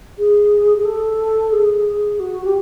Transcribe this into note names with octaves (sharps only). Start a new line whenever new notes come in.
G#4
G#4
A4
G#4
F#4
G4